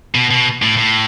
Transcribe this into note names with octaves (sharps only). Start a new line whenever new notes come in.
B2
B2
A2
A2